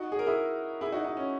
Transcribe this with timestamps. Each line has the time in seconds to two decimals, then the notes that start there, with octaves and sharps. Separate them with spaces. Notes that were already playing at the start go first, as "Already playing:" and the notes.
Already playing: D#4 F#4
0.12 G#4
0.19 A#4
0.27 E4 G#4
0.81 E4 G#4
0.92 D#4 F#4
1.04 D#4
1.17 C#4